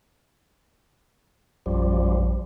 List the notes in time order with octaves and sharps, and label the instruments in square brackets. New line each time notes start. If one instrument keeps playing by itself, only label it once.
[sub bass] A#1 [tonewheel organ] F#2 F3 G3